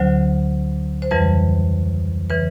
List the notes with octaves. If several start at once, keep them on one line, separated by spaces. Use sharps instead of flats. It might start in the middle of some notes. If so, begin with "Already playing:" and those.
Already playing: D2 D3 F#3 C5
C5
F2 C#3 E3 G3 B4
C#3 E3 B4